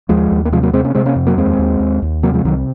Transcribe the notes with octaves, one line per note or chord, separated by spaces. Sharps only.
D#2 F3 G#3
D#2
A#3
C3 F3 G#3
F#3 A#3
C3 G#3 C4
A#3 C#4
C3 G#3 C4
A#3 C#4
F2
F#3 A#3
D#2 G#3 C4
D#2
D#2
D#2
C3 F#3 A#3
F3 G#3
C2 D#3 F#3